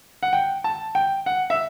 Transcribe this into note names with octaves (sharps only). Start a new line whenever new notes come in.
F#5
G5
A5
G5
F#5
E5